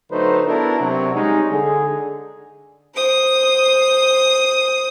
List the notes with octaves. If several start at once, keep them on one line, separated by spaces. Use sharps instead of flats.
D3 F#3 A3 D#4 B4 C5
B3 D4 E4 F#4 A4 A#4
C3 F#3
G3 G#3 C#4 D#4
D3 G#4
C5 D#6